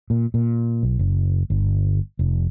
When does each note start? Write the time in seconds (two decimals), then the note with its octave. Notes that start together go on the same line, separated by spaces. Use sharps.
0.10 A#2
0.34 A#2
0.83 B1
0.99 F#1
1.50 G1
2.19 F1